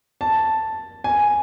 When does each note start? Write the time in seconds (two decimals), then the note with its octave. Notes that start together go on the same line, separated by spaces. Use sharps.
0.21 A5
1.04 G#5